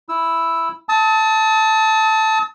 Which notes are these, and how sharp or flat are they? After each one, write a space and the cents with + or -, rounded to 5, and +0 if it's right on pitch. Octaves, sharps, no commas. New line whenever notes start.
E4 +0 E6 +0
A5 +0 D#6 +45